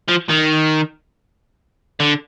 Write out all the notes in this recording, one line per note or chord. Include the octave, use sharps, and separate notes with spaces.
F3
D#3
D3